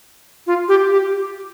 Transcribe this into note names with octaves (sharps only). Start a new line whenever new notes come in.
F4
G4
G4